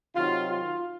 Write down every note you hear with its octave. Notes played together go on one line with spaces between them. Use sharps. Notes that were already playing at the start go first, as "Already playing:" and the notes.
C3 D#3 F#3 F4
F4